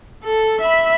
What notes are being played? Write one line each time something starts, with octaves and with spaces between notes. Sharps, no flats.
A4
E5 B5